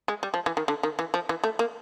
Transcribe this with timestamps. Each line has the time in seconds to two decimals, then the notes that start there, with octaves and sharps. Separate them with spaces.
0.08 G#3
0.23 G3
0.34 F3
0.46 E3
0.57 D#3
0.68 D3
0.83 D#3
0.99 E3
1.14 F3
1.29 E3
1.44 A3
1.59 A#3